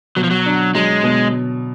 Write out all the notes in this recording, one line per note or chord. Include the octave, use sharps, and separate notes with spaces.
B2 F#3
F3
F#3
D4
F#3 G#3
B2